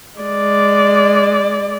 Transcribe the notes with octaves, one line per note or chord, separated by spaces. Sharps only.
G#3 D5